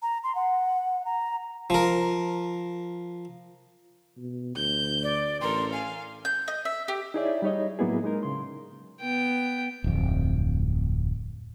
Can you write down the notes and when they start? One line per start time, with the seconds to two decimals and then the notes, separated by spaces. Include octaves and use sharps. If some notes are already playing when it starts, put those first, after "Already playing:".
0.02 A#5
0.24 C6
0.35 F#5
1.05 A#5
1.70 F3 A#4
4.17 B2
4.55 D2 G6
5.03 D5
5.41 A1 A4 A#4 C6
5.73 F5 G#5
6.25 G6
6.48 D#5
6.65 E5
6.88 G4
7.14 D#4 E4 G#4 C#5 D5 E5
7.42 G3 D#4 C#5 D#5
7.79 A2 F#3 A#3 B3 E4 G#4
8.04 G#3 D#4 A#4
8.23 C#3 C6
9.01 B3 G5
9.84 D1 F2